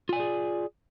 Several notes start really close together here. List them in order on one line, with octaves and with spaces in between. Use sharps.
F4 G#5 D5 G#4